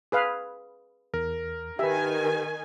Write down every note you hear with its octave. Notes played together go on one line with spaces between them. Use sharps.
G#4 B4 F5
E2 A#4
D#3 G4 B4 E5 G#5